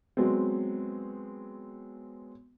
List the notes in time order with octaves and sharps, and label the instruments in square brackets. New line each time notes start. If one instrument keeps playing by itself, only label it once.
[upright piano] F#3 G#3 B3 C4